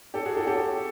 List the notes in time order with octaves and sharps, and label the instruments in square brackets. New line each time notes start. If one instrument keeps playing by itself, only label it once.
[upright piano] G4 A4
F#4 G#4
G4 A4
G4 A4